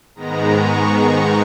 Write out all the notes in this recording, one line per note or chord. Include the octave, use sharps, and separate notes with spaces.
G#2 D#3 G#3 B3 A#5
C#6
C#6